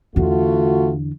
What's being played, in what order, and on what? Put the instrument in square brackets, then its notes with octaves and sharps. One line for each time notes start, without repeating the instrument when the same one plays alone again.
[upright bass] E2 D3 [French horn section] A3 F4 F#4